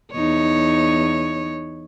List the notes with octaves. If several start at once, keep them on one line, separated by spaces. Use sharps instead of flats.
E2 D#4 C#5